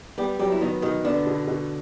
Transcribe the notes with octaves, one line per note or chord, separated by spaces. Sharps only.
G3 B3 G4
F#3 G3 G4
E4
D#3 B3 D#4
B2 D#3 D#4
D3 B3 D4
B2
B2